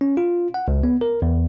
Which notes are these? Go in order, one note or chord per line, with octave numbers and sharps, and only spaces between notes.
C#4
F4
F#5
C#2
B3
A#4
E2